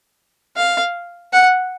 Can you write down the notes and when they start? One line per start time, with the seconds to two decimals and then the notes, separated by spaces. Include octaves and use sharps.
0.57 F5
1.33 F#5